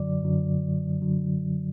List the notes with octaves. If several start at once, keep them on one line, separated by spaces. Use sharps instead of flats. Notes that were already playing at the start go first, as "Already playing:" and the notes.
Already playing: F#2 D3 F#3 D5
F#2 D3 F#3
D3 F#3